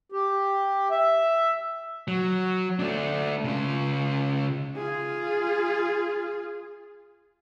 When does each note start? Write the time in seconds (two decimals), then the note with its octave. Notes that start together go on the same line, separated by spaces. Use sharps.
0.12 G4
0.91 E5
2.08 F#3
2.79 A3 D4
3.44 C#3 F4
4.77 F4 G#4